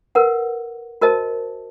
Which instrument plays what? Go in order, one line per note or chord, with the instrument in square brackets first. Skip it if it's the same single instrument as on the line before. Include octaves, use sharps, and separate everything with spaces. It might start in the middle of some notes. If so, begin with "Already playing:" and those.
[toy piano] A#4 B4 F#5
F#4 A#4 C5 D#5 A5